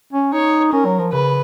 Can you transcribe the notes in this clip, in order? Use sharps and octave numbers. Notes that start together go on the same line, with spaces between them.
C#4
D#4 C#5
C#4 A#4
F#3
F3
C#3 B4